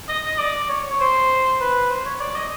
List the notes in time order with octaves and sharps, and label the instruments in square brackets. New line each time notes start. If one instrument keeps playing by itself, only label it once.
[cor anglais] D#5
D#5
D5
C#5
C#5
C5
B4
C5
C#5
D5
D#5